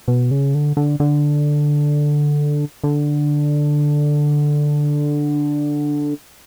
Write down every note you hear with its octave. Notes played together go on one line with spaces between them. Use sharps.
B2
C#3
D3
D3
D3
D3